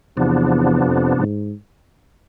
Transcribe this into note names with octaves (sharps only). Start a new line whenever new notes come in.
E2 C3 F3 B3 D4
F2
G#2